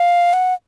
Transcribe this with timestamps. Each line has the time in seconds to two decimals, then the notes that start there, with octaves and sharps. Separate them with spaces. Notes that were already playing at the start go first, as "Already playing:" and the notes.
Already playing: F5
0.33 F#5